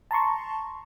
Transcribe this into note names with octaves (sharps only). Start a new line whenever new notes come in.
A5 A#5 C6 C#6